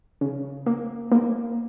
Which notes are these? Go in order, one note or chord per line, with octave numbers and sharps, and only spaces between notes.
C#3
A#3
A#3